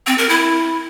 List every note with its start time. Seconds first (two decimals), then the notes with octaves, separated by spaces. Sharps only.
0.07 C4
0.18 A#4
0.29 E4